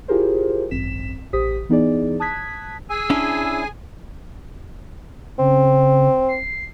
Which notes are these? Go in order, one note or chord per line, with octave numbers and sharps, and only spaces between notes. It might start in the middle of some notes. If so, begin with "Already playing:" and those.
E4 F4 G4 G#4 A#4 C5
G#1 F#2 C4 B6 E7
A1 G4 C5 D#6 B6
E3 B3 D#4 E4 G#4 D5
A5 D#6 F#6 G#6 B6
G#4 G#5 E6
C#4 D4 E4
C#3 C4
C7